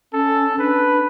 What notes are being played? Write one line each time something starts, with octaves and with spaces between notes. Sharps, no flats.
C#4 A4
D4 B4